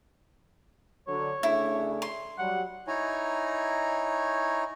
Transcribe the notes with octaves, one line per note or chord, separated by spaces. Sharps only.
D3 F#3 C#5
C#3 A3 D4 E4
C6
F#3 G3 F#5
D#4 E4 C#5 G#5 A#5